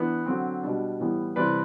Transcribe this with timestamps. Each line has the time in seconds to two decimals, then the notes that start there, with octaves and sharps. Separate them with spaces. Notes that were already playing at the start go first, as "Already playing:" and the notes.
Already playing: E3 B3 D4
0.26 D3 F#3 C4
0.63 B2 G3 D4
1.00 A2 E3 G3 B3
1.36 C3 E3 G3 B4 D5